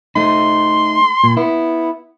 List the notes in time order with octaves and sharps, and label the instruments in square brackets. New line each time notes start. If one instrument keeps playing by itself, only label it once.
[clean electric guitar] A3 D#4 [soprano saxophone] C6
[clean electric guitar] A#2
[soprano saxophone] B3 [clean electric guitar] E4